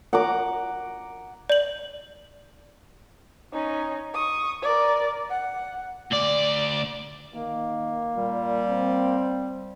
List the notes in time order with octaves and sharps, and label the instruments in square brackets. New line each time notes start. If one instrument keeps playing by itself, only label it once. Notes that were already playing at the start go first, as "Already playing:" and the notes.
[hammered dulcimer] F#5 A#5 D6
[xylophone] D5 F#7
[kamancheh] C#4 D#4
C#6 D#6
A#4 D5
F#5
[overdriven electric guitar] D2 D5
[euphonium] D#3 [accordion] A#3
[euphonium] A#2 [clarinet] G3
[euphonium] C4